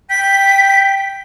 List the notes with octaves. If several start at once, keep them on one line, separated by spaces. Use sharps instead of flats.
G5 B6